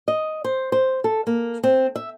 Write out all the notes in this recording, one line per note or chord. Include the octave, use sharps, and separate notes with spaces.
D#5
C5
C5
A4
A#3
C4
E5